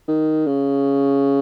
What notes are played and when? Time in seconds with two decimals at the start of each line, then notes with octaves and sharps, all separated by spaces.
0.08 D#3
0.47 C#3